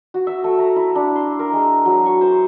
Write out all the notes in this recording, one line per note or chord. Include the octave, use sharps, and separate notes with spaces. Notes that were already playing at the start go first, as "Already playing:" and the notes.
F#4
E5
A3
A#5
E4
D4
C6
A#4
G#3
F#3
C#6
C5